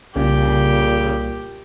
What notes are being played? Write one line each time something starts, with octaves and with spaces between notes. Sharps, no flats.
C2 A#2 C#3 G4